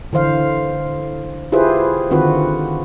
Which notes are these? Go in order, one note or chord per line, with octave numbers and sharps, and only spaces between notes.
D3 E3 C5 F5
E4 F4 G4 G#4 B4 C5
D3 D#3 C4 F4 F#4 B4